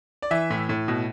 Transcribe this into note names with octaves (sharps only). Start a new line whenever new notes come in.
D5
E3 E5
A2
A2
B2